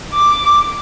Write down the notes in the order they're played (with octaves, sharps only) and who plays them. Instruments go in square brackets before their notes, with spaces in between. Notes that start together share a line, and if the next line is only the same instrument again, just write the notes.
[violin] D6